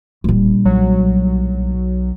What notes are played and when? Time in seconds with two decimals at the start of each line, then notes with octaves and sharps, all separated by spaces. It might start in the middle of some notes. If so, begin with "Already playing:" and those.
0.24 E1 A#1 G3
0.65 B1 F#3